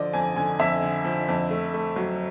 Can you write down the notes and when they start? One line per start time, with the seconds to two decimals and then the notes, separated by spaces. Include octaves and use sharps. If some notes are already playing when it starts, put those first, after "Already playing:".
Already playing: D3 F3 D5 D#5
0.14 F2 G#5
0.36 D3 G#5
0.59 F2 E5
0.83 D3
1.05 F3
1.28 F2
1.51 A3
1.74 A3
1.96 F#3